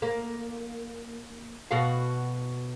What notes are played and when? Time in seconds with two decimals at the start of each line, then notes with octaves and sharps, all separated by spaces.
0.02 A#3
1.71 B2 F#4 F5